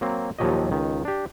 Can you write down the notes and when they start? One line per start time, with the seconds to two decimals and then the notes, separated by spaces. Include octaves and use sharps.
0.01 F#3 A#3 C4
0.38 D#2 A#2 F3 F#3 G4 D#5
0.71 C#2 D#3
1.05 D4 G4